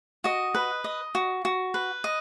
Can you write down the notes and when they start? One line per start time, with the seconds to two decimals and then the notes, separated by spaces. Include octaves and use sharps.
0.24 F#4 D#5
0.55 B4
0.84 D#5
1.15 F#4
1.45 F#4
1.74 B4
2.04 D#5